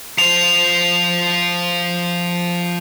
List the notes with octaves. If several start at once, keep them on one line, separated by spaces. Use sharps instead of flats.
F3 C5 F7